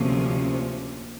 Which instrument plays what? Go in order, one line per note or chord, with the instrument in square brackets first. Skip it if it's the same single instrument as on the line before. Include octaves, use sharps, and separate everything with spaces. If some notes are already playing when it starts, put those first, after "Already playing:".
Already playing: [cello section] D2 C3 F3 A#3 C#4